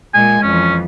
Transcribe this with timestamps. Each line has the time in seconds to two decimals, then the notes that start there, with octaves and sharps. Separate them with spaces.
0.14 A#2 G#3 G#5
0.43 F2 E3 C#4